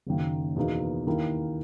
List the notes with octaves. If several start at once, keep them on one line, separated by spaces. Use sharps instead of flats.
F#1 F#2 D#3 A#3
E2 B2 A#3 D#4
D#2 D#3 A#3 E4 A#4